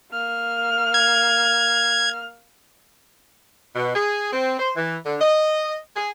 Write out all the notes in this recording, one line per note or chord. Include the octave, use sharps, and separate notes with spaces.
A#3 F6
G#6
B2
G#4
C4
C5
E3
D3
D#5
G#4